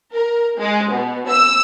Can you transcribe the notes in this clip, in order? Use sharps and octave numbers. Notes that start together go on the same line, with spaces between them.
A#4
G#3
B2
E6